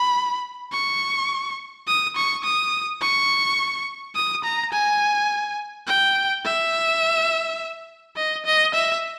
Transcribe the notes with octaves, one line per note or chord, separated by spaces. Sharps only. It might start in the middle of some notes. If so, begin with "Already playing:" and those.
Already playing: B5
C#6
D#6
C#6
D#6
C#6
D#6
A#5
G#5
G5
E5
D#5
D#5
E5